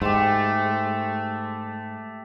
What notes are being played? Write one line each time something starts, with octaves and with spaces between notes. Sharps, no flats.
G#2 A3 G4 C6